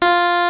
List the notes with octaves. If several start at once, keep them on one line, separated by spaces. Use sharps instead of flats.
F4